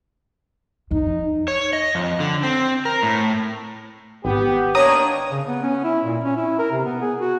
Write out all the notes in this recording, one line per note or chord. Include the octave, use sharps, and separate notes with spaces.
F2 D#4
C#5
D#5
F2
D3
C4
A#4
A2
G#1 B3 G4
D#3 A#3 D4 C#5 A#5 D#6
C#3
B3
C#4
E4
A#2
C#4
E4
A#4
C3
B3
G#4
F#4